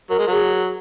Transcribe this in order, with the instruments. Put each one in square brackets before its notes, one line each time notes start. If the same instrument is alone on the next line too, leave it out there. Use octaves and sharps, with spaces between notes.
[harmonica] F#3 [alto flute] A#4
[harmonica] G#3
[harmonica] F#3 [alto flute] G#4